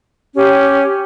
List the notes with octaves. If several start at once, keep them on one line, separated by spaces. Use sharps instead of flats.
C#4 G4